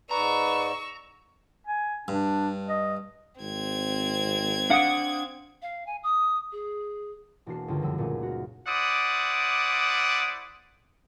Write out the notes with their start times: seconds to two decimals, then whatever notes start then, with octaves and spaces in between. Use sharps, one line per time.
0.11 G#2 B4 D5 A#5 C#6 E6
1.67 G#5
2.08 G2 D4
2.69 D#5
3.41 G#1 C4 G#6
4.70 D4 F5 F#5 D#6 D7
5.62 F5
5.86 G#5
6.03 D#6
6.52 G#4
7.46 E1 A#3 D4 F#4 A5 C7
7.68 C#2 G2 D3 F4 G5
7.81 E1 A#1 F#2 G3 E6
7.98 A#2 A3 C#4 D#4 G#4
8.23 F#4 A#4
8.67 E4 C5 D5 F#5 D6 D#6